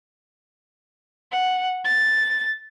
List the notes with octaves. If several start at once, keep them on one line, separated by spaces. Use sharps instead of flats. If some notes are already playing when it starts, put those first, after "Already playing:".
F#5
A6